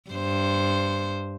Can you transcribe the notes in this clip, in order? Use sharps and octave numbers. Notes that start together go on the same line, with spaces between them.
G2 C5